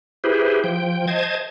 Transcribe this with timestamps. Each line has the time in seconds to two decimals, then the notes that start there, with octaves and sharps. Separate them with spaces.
0.24 E4 G4 G#4 B4 C5
0.64 F3 G5
1.07 C5 D#5 A5 G#6